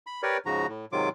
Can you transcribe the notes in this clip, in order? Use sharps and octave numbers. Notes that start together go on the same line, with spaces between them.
B5
G4 A#4 B4 C#5 D5
G#2 C#3 F3 F#4 A#5
A2
G#2 C3 D#3 F#3 F4 D6